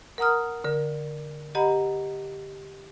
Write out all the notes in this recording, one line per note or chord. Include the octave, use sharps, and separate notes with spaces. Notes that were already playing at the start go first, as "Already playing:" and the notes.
A#4 F#5 A#5 D#6 F6
D3 A#4
G4 D#5 F#5 A#5 B5